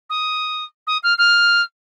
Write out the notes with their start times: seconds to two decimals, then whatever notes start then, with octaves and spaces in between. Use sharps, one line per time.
0.09 D#6
0.87 D#6
1.03 F6
1.18 F6